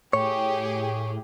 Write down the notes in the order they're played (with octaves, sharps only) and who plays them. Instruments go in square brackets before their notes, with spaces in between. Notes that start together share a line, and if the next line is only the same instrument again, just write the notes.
[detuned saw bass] A2 [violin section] G4 G#4 [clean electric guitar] C#5